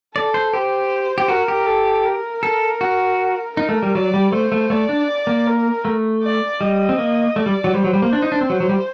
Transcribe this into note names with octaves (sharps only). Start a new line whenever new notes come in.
A4 D5
C5
G4 C5
G4
F#4 A#4
G4
A4
A#4
A4
F#4
D#4 A#4
A3
G3
F#3 D5
G3
A3 C5
A3
A3 D5
D4
A#3
A#4
A3
D5
G3 D#5
C4
A#3
A3 D5
G3
F#3
G3 C5
F#3
G3
A#3
D4
D#4
D4
C4
F#3
F#3
G3